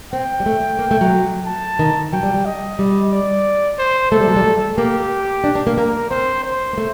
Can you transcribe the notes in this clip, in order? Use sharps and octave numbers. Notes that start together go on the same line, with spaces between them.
C4 G5
G3
A3
A#3
A3
F#3
A5
D#3
F#3 G5
G3
G3
D#5
G3
D5
C5
A3 A4
G3
F#3
G3
A3
A#3 G4
D4
D4
A#3
A#3 A#4
C4 C5
C5
A#3
A3